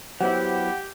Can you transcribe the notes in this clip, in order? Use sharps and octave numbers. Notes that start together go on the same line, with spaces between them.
F#3 B3 E4 G4 C5 F#5